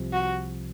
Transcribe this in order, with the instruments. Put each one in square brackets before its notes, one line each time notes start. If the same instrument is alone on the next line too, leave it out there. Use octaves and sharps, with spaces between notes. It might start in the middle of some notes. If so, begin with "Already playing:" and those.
Already playing: [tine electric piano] C2 C3 F3
[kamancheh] F#4